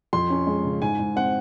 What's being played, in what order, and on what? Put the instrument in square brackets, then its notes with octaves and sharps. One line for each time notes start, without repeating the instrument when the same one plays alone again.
[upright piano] F2 C6
C#4
G#3
C#3
G#2 G#5
G#2
C4 F#5